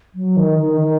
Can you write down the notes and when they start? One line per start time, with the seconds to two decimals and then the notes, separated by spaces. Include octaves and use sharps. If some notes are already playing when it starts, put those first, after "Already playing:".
0.15 F#3
0.37 D#3
0.59 D#3
0.81 D#3